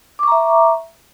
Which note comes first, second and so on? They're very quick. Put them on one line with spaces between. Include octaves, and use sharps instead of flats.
D6 C#6 A#5 E5